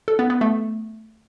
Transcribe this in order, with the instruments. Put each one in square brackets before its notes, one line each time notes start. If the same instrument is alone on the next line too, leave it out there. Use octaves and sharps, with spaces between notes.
[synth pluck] A4
B3
B3
A3